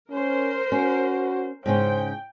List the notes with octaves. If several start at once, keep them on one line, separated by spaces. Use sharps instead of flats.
C#4 A#4 C5
C#4 F#4
G#2 C#3 C#4 C5 G5